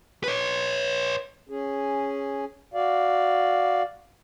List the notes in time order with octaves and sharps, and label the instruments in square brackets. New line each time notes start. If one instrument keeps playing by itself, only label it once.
[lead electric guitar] B4 C#5
[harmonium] C#4 G#4
F#4 D5 F5